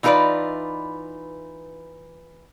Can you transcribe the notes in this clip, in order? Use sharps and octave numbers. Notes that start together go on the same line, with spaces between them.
E3 D#4 F4 A#4 B4 D5